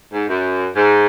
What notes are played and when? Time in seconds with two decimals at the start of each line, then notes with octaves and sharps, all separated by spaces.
0.13 G#2
0.28 F#2
0.75 G#2